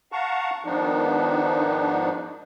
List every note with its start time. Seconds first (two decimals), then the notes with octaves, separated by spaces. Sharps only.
0.12 F5 F#5 A5 A#5 C#6
0.64 G#2 D#3 F3 B3 D4 D#4